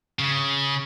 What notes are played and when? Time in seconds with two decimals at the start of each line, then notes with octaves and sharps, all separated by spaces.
0.19 C#3